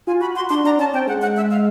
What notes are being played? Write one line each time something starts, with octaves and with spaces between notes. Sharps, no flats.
F4 G#5
F#4 B5
F#4 C6
D4 C6
D4 A#5
C#4 A5
C4 G5
G#3 F#5
F#5
E5
F5